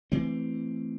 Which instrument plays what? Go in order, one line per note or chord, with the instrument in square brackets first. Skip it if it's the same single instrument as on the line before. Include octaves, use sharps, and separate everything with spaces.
[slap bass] E3 A3 C4